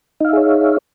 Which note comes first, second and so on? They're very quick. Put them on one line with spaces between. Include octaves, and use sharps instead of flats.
D#4 F5 E5 G#4 C#5